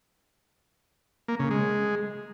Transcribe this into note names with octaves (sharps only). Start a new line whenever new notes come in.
A#3
C#3
G#3